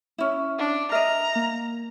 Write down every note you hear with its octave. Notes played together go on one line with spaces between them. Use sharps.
C#4 E4
D4
A#4 D#5 E5 A#5 F6
A#3